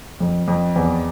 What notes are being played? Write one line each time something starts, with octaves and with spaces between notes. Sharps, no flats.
F2
F2
E2